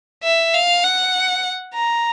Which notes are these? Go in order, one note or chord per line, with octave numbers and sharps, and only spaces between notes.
E5
F5
F#5
A#5